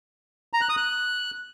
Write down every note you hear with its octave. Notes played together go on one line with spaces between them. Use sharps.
A#5
F#6
D#6
F#6